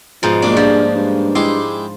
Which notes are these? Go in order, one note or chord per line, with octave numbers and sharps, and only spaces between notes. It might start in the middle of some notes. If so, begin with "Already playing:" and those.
G#2 B2 F3 D#4
G#3 A#3 C#4 D4
G2 F3
G2
G#3 E4 G4 C6